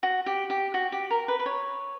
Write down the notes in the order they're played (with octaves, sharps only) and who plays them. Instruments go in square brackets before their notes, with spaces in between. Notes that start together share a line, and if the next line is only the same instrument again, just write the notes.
[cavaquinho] F#4
G4
G4
F#4
G4
A#4
B4
B4
C#5